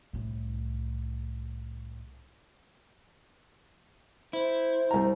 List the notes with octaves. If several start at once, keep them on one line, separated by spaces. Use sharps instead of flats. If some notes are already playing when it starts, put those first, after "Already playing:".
C2 A2
E4 C5
C2 A#5